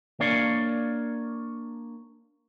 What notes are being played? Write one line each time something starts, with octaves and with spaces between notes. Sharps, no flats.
A#3 D4 A#4 C#5 D5 F5